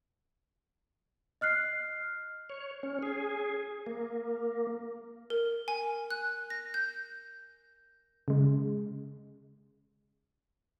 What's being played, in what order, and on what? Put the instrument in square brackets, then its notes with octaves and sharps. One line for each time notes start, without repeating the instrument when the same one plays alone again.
[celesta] D#5 F6 F#6 C7
[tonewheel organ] C#5
C#4
G#4
A#3
[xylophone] A#4
G#5
F#6
A#6
G6
[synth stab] C#3 G#3